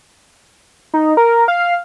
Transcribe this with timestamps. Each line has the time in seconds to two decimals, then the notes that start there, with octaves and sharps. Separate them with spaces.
0.94 D#4
1.17 A#4
1.48 F5